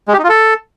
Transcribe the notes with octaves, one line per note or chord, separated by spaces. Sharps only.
G#3
G4
D#4
F4
A4